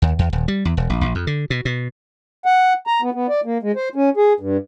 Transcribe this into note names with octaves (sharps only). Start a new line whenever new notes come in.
D#2
E2
D#1
G3
E2
E1
A#1
A#1
F2
D3
B2
B2
F#5
A#5
B3
B3
D5
A#3
G#3
C5
C#4
G#4
G2